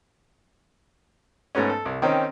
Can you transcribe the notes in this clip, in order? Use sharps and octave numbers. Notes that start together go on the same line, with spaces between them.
G#2 A3 B3 C#4
A4
C2
D#3 C4 C#4 D#4